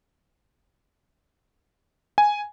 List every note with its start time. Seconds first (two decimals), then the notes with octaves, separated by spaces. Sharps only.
2.18 G#5